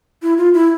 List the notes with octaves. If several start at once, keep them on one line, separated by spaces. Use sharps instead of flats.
E4
F4
E4